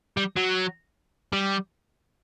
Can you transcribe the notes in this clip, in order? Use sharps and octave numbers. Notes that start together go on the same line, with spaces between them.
G3
F#3
G3